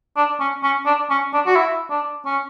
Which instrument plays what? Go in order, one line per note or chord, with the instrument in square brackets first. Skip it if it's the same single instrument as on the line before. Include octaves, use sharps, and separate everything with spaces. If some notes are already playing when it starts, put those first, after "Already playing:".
[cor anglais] D4
C#4
C#4
D4
C#4
D4
F#4
E4
D4
C#4